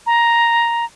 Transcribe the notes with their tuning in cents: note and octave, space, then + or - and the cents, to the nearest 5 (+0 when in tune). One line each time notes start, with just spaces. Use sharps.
A#5 +5